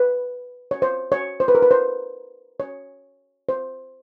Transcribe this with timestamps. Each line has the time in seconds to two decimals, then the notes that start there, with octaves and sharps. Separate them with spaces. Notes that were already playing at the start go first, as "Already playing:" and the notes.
Already playing: B4
0.71 C#5
0.82 C5
1.12 C#5
1.40 C5
1.48 B4
1.55 A#4
1.62 B4
1.71 C5
2.60 C#5
3.49 C5